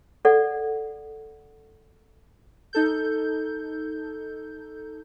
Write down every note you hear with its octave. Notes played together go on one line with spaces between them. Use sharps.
A4 D5 F#5
D#4 A4 G6